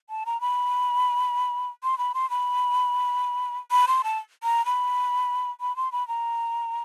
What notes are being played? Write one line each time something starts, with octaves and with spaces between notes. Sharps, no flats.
A5
A#5
B5
C6
B5
C6
B5
B5
C6
A5
A#5
B5
B5
C6
B5
A#5